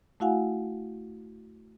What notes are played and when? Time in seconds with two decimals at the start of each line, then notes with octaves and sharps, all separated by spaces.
0.20 A3 E4 F#4 F5 F#5 G#5